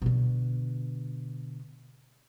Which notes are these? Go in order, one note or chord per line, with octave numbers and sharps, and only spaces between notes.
B2 D3